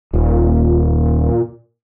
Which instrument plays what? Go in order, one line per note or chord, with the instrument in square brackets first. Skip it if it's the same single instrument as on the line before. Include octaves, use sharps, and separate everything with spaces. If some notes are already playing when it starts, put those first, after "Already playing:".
[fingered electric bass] D#1 [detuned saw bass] A#2